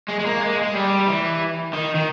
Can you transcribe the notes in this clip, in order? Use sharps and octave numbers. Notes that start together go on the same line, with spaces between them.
G#3
G#3
A#3
G#3
G#3
G3
E3
D#3
D#3